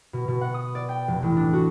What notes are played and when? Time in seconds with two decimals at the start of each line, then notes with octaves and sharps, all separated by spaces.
0.13 B2
0.28 B2
0.41 F#5
0.54 D#6
0.75 D5
0.89 G5
1.08 F1
1.23 A1
1.37 D4
1.53 F#4